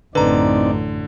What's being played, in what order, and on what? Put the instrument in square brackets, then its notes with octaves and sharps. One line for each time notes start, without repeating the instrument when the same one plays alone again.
[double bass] A1 F#2 [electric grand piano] D3 [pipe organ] C4 D#4 D5 [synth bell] B4 A#5